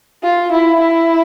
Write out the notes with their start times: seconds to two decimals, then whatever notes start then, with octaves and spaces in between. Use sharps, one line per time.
0.23 F4
0.52 E4
0.80 E4